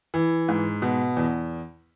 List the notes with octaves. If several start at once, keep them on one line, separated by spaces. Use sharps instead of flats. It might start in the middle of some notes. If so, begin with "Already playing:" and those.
E3
G#2
B2
E2